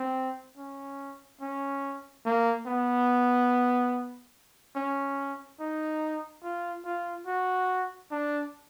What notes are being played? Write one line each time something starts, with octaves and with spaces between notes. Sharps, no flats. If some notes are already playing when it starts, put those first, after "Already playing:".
Already playing: C4
C#4
C#4
A#3
B3
C#4
D#4
F4
F4
F#4
D4